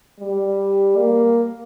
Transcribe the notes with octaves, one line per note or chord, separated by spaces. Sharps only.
G3
A#3